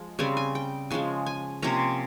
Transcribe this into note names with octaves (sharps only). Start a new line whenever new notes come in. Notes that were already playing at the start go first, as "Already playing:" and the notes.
Already playing: F3 G#3
C#3 G3 C4 G#5
G#5
G5
C#3 F3 G#3 G#5
G#5
C3 F3 A#3 C#4 A#5